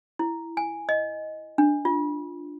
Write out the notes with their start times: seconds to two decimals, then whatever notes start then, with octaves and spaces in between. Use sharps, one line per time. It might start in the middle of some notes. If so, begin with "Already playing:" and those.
0.19 E4
0.57 G#5
0.89 D#5
1.58 D4
1.85 F4